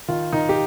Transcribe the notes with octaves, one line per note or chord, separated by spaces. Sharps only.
D#3 F4
D#3 D#4
G4